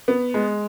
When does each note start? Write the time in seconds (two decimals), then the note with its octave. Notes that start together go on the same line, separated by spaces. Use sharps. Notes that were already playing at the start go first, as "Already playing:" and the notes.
0.08 B3
0.34 G#3